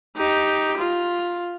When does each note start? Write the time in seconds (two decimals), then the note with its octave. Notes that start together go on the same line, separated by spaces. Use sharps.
0.17 D#4 G4
0.78 F4